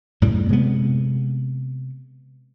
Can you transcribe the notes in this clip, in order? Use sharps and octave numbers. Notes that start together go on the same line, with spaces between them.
F#2 A2 C#3 G3
C3 G#3 B3